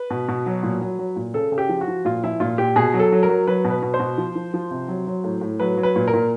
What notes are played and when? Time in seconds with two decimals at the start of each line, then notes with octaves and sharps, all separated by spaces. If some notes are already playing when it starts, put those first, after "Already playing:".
Already playing: B4
0.10 B2
0.28 B2
0.46 F#3
0.63 A#2
0.81 F#3
0.99 F#3
1.16 A#2
1.34 C#3 A4
1.52 C#3
1.58 G4
1.69 F3
1.81 F#4
1.88 F3
2.05 A#2 F4
2.24 F3 E4
2.40 A#2 F4
2.58 A#2 G4
2.76 B2 G#4
2.94 F#3
2.99 A4
3.12 F#3
3.23 A#4
3.29 F#3
3.47 F#3 B4
3.64 B2
3.70 B4
3.82 B2
3.94 C5
4.00 B2
4.18 F3
4.36 F3
4.54 F3
4.71 C3
4.88 F#3
5.07 F#3
5.24 A2
5.41 A2
5.60 F#3 B4
5.77 F#3
5.83 B4
5.96 A#2
6.08 A#4
6.13 A#2